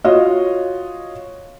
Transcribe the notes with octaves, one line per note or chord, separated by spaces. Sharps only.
F4 F#4 C#5 D#5